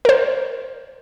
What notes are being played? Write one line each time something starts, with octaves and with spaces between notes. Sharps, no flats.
A#4 C5